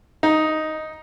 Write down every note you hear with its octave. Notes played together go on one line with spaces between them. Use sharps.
D#4